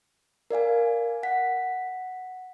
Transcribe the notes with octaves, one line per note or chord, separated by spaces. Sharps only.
A#4 D5 F5 G#5
F#5 B6